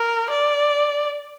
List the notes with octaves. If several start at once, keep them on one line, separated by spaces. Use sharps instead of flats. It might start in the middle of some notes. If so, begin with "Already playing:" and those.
Already playing: A#4
D5